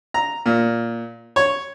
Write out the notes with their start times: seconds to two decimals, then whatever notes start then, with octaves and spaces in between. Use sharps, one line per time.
0.14 A#5
0.46 A#2
1.36 C#5